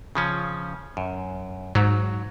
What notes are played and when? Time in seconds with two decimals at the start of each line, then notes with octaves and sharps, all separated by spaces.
0.15 C#3 F3 C#4
0.97 F#2
1.75 G#2 F#3